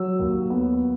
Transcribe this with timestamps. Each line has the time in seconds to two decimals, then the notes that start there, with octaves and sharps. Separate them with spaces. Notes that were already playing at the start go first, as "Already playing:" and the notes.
Already playing: F#3 E6
0.19 D#2
0.50 B3